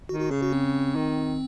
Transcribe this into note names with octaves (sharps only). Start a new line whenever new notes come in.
D#3 F#4
F#4
C#3 G#4
F#4
C4
D#3